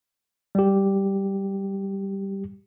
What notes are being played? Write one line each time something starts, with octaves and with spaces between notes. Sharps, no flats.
G3 G4